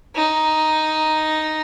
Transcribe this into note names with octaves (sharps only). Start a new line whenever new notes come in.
D#4